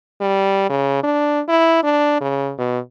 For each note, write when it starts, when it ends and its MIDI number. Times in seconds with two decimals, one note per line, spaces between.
0.21 0.68 55
0.70 1.03 49
1.04 1.40 62
1.49 1.83 64
1.84 2.17 62
2.21 2.53 49
2.58 2.79 47